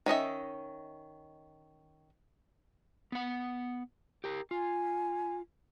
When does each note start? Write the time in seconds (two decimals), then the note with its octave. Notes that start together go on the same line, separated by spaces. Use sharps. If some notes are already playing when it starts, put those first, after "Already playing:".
0.06 D#3 C#4 D#5 E5
3.12 B3 F#5
4.24 G4 A#4
4.51 F4 G#5